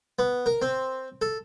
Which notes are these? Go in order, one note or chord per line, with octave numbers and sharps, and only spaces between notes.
B3
A#4
C4
A4